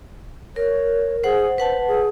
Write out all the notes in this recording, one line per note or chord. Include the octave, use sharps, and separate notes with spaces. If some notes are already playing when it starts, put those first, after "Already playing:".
A#4 C#5
G#4 C5 F#5
B4 C5 F#5 A5
G#4